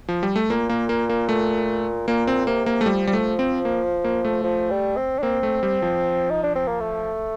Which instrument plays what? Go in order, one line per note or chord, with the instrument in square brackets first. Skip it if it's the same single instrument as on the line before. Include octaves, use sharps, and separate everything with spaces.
[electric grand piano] F3
G3
A3
[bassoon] A#2 [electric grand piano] A#3
[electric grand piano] A#3
A#3
A#3
A3
[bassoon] A#2 [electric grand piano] A#3
[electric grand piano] C4
[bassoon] C3 [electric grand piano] A#3
[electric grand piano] A#3
A3
[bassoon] F3 [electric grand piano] G3
[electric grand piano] G3
A3
C4
A#3
A#3
A3
[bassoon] F3
G3
C4
D4
[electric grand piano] A#3 [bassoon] C4
[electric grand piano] A3
G3
F3
[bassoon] D#4
D4
C4
A#3
A3